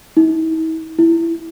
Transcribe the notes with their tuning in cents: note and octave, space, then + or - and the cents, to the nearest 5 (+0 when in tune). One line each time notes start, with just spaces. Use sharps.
E4 -45
E4 +10